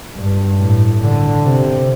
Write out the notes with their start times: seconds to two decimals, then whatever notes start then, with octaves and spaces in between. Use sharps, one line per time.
0.15 G2
0.59 A2
1.01 D3
1.44 C3